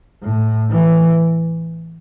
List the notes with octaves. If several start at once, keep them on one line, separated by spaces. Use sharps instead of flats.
A2
E3